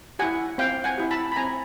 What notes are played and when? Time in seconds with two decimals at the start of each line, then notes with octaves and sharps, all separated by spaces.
0.19 E4 G4 F#5 G#5
0.58 C4 F5 G5
0.84 F#5 G#5
0.98 E4 G4
1.11 A5 B5
1.32 B5
1.36 C4 G#5 A#5